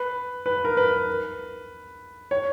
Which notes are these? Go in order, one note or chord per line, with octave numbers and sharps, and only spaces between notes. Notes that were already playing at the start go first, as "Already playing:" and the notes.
Already playing: B4
B4
A#4
B4
C#5